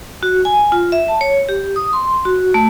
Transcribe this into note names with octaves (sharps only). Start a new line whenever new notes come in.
F#4
G#5
F4
E5
A5
C#5
G4
D#6
C6
F#4
A3